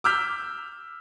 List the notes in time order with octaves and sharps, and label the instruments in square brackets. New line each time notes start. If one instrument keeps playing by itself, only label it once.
[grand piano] D6 E6 F6 G6 B6